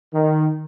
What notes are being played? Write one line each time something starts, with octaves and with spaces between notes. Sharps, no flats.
D#3